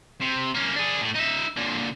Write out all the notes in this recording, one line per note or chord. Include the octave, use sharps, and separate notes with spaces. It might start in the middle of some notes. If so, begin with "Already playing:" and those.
C3
A#3 C#4
D4 G#4
A2
D#4 E5
A#2 D3